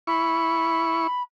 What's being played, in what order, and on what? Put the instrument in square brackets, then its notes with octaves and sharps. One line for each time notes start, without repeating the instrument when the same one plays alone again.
[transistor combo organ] E4 C#6 [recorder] B5